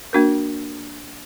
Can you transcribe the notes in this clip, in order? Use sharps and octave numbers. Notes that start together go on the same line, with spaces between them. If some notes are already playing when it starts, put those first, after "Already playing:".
A#3 D4 F#4 A#4